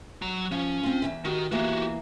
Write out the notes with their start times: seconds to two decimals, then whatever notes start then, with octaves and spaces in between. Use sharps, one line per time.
0.22 F#3 A#5
0.52 F3 C#4
0.83 C4 F4
1.02 E2 C3 E5
1.25 D#3 F#4 G4
1.52 E3 A#3 B3 F#4 G4